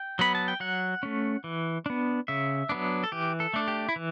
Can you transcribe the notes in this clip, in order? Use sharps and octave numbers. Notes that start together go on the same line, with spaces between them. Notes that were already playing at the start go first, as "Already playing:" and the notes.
Already playing: G5
F#3 B3 B5
A5
G5
F#3 F#5
A3 C#4
E3
B3 D4
C#3 E5
F#3 B3 D4
A4
E3 G4
A4
A3 D4
G4
E4
E3